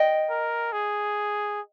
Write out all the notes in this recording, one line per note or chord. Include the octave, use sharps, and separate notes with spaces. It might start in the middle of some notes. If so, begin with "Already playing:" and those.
Already playing: D#5 G5
A#4
G#4